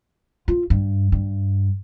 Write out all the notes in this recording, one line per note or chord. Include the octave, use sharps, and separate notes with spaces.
F4
G2
G2